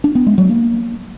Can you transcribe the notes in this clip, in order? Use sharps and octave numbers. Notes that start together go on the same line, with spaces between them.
D4
B3
G#3
F#3
A#3